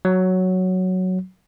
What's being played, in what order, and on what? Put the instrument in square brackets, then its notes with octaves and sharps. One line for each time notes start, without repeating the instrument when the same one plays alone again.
[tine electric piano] F#3